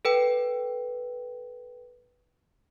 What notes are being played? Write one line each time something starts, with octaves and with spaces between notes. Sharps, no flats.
A4 B4 G5